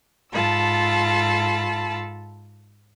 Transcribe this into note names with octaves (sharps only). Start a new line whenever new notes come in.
G#2 F4 A4 A5 B5 E6